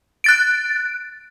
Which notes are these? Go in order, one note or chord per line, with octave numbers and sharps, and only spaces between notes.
F#6 A6 D7